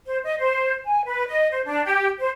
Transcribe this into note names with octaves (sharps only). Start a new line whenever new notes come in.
C5
D#5
C5
G#5
B4
D#5
C5
D4
G4
C5